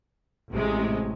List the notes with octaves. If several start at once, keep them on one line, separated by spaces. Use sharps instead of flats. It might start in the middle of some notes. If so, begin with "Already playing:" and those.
A1 C3 G#3